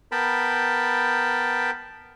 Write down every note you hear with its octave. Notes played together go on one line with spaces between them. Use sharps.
B3 A#4 G5 A5 B5